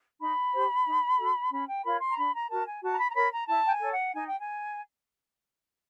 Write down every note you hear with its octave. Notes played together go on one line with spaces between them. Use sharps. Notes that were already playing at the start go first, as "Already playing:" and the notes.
D#4 B5
G4 C5
D#4
F#4 A4
C#4 B5
G5
F4 A#4 C#5 B5
C6
A#5
D4 B5
A#5
F#4 A#4 A5
G#5
F#4 A5
A#5
B5
A#5
A#4 C#5 B5
A#5
E4 A5
G5
G#5
A4 C#5
F#5
D#4 G#5
G5
G#5